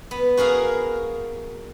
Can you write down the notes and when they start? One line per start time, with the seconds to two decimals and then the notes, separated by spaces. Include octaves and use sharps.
0.11 B3
0.37 F#4 G#4 A#4 F5